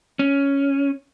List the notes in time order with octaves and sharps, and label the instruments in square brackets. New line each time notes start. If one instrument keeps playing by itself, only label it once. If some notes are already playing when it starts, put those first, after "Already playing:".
[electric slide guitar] C#4